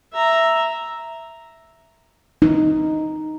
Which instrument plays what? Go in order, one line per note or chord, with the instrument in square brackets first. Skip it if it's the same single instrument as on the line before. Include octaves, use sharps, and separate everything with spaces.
[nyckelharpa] E5 A#5
[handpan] D#4